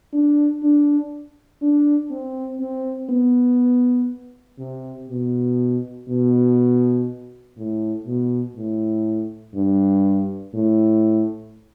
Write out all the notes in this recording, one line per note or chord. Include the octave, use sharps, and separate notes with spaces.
D4
D4
D4
C4
C4
B3
C3
B2
B2
A2
B2
A2
G2
A2